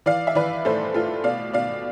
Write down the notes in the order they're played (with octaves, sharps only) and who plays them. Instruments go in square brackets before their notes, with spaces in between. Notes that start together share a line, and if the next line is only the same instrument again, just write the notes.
[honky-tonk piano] E3 D5 F5
E5
E3 B4 D5
A2 A4 C5
A2 F4 A4
B2 D5 F5
B2 D5 F5